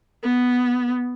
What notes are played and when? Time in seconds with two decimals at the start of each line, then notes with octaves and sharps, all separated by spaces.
0.23 B3